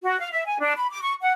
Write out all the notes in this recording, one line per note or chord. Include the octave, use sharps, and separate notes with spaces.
F#4
F5
E5
G#5
D4
B5
D6
C#6
F#5